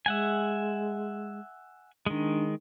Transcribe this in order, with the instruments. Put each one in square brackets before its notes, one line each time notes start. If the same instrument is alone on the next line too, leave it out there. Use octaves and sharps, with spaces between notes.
[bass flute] G#3 [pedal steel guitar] E5 F#5 G#5
[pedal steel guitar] D#3 G#3 [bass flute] D4